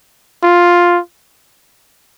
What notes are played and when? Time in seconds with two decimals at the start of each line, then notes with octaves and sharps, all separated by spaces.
0.43 F4